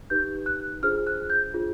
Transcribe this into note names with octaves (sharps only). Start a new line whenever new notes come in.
D#4 G4 B4 G6
F#6
D4 F4 G#4 C5 F6
F#6
G6
D4 F4 G#4 C5